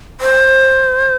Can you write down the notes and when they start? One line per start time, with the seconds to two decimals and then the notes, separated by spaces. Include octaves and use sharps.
0.21 C5